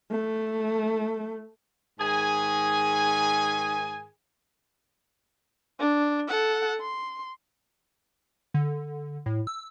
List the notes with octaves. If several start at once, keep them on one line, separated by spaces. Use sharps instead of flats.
A3
G#2 D#3 G#4 G#5
D4
A4 F#5
C6
D3
A2
E6